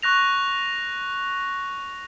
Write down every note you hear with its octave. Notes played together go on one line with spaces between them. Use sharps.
C#6 F#6 A#6 F7